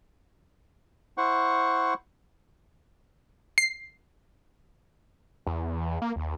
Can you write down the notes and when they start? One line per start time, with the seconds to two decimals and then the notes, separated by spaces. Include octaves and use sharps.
1.18 E4 C5 F#5 C#6
3.58 C7
5.47 E2
6.02 A#3
6.16 D#2